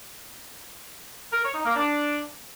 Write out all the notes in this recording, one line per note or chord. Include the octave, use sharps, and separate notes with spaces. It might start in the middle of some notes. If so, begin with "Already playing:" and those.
A#4
C#5
D#4
A#3
D4